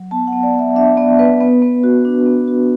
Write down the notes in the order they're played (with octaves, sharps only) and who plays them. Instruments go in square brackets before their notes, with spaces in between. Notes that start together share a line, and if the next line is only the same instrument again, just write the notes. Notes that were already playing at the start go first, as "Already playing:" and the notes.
Already playing: [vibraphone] F#3
B3 A5
F#5
B3
D5
B3 E5
D4 E5
B3 D5
B3 B4
B3
B3
F#4
D4
B3
F#4